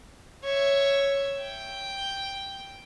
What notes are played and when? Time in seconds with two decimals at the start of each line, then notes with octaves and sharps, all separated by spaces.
0.44 C#5 E5
1.41 G5